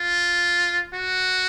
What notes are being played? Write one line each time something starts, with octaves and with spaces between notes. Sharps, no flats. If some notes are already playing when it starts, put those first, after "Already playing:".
Already playing: F4
F#4